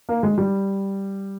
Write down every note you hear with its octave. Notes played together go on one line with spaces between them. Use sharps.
A#3
G#3
G3